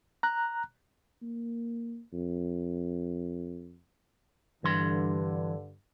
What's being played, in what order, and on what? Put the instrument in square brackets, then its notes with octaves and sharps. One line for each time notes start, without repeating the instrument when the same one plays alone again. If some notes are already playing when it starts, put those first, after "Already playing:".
[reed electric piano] A#5 F#6
[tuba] A#3
F2
[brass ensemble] G2 D3 [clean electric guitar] E3 C6